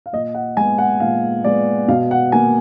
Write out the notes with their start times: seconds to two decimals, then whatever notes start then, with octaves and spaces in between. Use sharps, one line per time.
0.06 F5
0.13 A#2 D#5
0.35 F#5
0.57 G#3 B3 G#5
0.78 F#5
1.00 A#2 F5
1.44 G#3 B3 D5
1.88 B2 F5
2.11 F#5
2.32 A#3 G#5